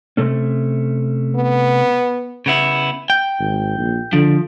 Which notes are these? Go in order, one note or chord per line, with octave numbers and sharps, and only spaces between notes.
C3 A3 C#4
B3
C#3 B3 E4
G5
G#1
A#1
D3 F3